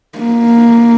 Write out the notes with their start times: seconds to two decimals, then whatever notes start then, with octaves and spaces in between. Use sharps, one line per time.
0.19 A#3